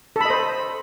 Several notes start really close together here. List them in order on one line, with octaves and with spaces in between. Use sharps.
A4 B5 D#5 C5